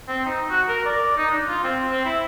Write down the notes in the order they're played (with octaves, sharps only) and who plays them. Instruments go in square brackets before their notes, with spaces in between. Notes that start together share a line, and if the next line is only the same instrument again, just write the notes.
[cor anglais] C4
D#4
F#4
A#4
D5
D#4
D4
F4
C4
C4
E4